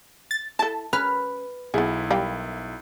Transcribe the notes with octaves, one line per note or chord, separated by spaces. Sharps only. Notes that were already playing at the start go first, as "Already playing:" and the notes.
A6
E4 A4 A5
C#4 B4 F6
B1 B3 E4 G#4
G3 A#4 F5 G5